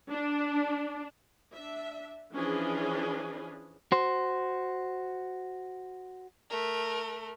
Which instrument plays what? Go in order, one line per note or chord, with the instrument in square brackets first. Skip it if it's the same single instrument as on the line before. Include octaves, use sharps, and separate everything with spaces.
[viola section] D4
D4 E5
E3 F3 C#4 D4 G#4 B4
[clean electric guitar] F#4 C5
[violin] A3 A#4